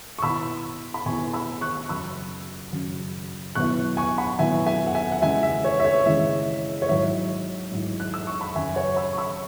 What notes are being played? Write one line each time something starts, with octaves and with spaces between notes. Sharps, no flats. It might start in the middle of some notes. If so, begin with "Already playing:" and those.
C#6
B2 B3 E4 B5 E6
B5
B2 B3 E4 G#5 C#6
B5 E6
C#6 F#6
F#2 C#3 F#3 B5 E6
F#2 C#3 F#3
B2 F#3 B3 E4 C#6 F#6
G#5 C#6
F#5 B5
B2 F#3 B3 E4 E5 G#5
E5 G#5
F#5
E5 G#5
F#5
C#3 E3 G#3 E5 G#5
E5
C#5
E5
C#5
C#3 E3 G#3 E5
C#5
G#2 F#3 E4 E5
G#2 F#3 E4
F#6
E6
C#6
B5
F#2 C#3 F#3 E5 G#5
C#5 F#5
B5 E6
C#6
B5 E6